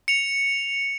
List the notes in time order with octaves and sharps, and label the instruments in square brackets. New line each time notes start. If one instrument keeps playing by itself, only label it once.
[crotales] C#7 F7